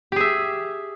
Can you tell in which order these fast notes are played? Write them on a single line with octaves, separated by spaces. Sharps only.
G4 G#4 E5